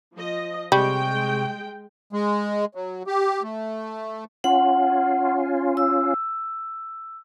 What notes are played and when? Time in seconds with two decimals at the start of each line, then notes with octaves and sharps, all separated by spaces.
0.14 F3 D#5
0.72 C3 G3 G#3 G5 C#6 G6
2.13 G#3
2.75 F#3
3.07 G4
3.43 A3
4.44 C#4 F4 F#5
5.77 E6